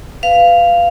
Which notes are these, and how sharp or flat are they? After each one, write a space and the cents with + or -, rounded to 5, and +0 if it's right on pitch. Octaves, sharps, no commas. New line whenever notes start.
B4 +15 F5 -10